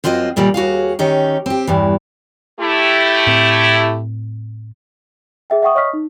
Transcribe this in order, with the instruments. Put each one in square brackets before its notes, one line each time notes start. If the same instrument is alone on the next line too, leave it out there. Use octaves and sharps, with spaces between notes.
[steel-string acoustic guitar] F#2 C4 F4 F#4 D#5
D2 A#2 D#3 G3 A#3
D#2 F#4 G#4 F5
D#3 C#4 D#4 G4
C4 G4
E2 G2 E3
[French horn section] A3 E4 G4
[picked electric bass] A2 C4
[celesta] G#4 E5 G5
E5 F#5 G5 C#6 D#6
C#5 D#5 C#6 D#6 F6 B6
D#4